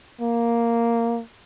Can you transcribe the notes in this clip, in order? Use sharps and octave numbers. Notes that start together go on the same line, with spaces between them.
A#3